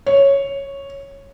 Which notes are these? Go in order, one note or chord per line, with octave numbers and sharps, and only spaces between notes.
C#5